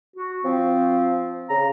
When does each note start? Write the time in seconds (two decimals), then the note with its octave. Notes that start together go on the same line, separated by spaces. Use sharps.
0.16 F#4
0.44 F3 C4
1.50 C#3 A#5